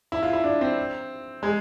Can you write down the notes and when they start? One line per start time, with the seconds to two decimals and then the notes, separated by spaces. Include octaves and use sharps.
0.12 E4
0.23 F4
0.33 E4
0.44 D4
0.61 C4
1.43 G#3